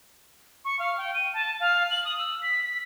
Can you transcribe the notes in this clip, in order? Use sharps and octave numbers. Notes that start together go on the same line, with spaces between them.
C#6
F5
G5
D#7
A5
F5
F#7
D#6
E6
B6
B6